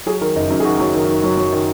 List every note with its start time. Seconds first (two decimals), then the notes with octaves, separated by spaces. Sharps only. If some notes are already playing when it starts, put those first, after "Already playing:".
0.06 F#3 G#4
0.21 D#3 A#4
0.36 F#1 D#4
0.50 F#2 D#4
0.60 G#4
0.65 D#3 F#4
0.80 F#3
0.94 D#3
1.08 D#3
1.24 F#3
1.37 F#3
1.52 D#3